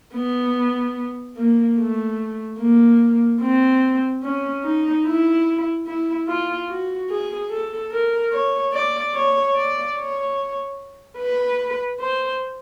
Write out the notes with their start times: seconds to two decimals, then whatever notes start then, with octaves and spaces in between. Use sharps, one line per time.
0.14 B3
1.37 A#3
1.78 A3
2.59 A#3
3.41 C4
4.23 C#4
4.64 D#4
5.05 E4
5.86 E4
6.27 F4
6.69 F#4
7.09 G#4
7.50 A4
7.91 A#4
8.32 C#5
8.73 D5
9.14 C#5
9.55 D5
9.96 C#5
11.18 B4
12.00 C5